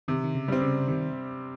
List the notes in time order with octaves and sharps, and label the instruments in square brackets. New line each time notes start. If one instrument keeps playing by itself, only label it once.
[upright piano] C3 [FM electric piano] D#3
[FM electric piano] D#3
C#3
[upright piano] G3 C4
[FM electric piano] C#3
[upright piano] C3 [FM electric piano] D#3